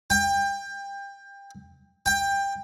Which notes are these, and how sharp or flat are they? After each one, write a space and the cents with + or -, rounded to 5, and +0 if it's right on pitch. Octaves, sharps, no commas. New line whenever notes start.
G5 +25
G5 +20